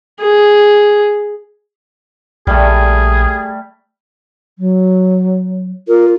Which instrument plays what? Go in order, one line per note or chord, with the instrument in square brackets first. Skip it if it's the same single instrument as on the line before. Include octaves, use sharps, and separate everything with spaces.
[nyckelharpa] G#4
[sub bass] A#1 [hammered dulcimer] G3 A3 [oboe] G#4
[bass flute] F#3
[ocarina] F4 [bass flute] A#4